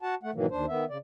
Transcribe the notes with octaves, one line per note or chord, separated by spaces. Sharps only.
F#4 F#5 A5
A3 F#5
G#2 B2 D#3 E3 F#3 A#3
D#2 D4 C5
D#3 B3 E5
C#3 D5